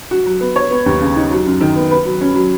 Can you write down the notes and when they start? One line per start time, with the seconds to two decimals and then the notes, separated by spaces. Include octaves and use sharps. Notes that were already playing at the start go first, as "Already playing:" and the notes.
0.11 F#4
0.26 F#3
0.41 B3
0.56 C#5
0.71 B3
0.86 D#2
1.01 C#3
1.16 D#4
1.31 F#3
1.46 F#2
1.61 D#3
1.76 B3
1.91 B4
2.05 F#3
2.21 C#4
2.35 F#3